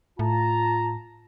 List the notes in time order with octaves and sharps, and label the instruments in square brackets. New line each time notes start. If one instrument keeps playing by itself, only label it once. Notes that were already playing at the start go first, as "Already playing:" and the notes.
[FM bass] A2 [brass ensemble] F4 A5 A#5